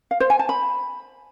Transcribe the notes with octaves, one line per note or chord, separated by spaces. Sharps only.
F5
C5
G#5
A5
B5